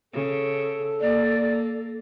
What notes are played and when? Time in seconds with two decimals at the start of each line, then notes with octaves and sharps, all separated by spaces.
0.13 C#3 A4
1.01 A#3 D5